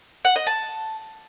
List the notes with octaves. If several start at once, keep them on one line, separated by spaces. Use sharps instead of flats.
F#5
D#5
A5